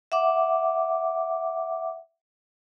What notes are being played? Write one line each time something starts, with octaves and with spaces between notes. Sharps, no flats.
E5 F#5 D6